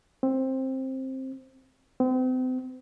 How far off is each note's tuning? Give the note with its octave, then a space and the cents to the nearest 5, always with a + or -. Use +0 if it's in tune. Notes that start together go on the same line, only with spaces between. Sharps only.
C4 +10
C4 -40